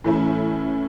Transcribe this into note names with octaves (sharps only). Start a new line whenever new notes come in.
A2 E3 A3 C#4 E4